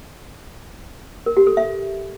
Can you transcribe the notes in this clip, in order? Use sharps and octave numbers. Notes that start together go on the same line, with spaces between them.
A#4
G4
A4
E5